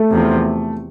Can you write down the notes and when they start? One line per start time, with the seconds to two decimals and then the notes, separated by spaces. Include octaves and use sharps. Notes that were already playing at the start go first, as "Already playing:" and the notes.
Already playing: A3
0.10 E2 C3 F3